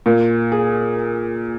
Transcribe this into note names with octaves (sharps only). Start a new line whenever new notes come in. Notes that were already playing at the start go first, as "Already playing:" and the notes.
A#2
G#4